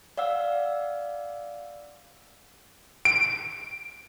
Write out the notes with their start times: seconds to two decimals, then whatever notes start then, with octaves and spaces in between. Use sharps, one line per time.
0.17 D5 F5 F#5 E6
3.05 D7